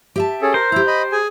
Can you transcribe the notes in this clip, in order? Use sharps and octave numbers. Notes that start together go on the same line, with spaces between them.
G4 E5 A5
C#4 G#4 A4
A#4 C5
E4 G4 A#5
D#5 B5
G#4 G#5